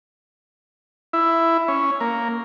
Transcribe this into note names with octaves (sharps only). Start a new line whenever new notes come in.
E4
C#4
A#3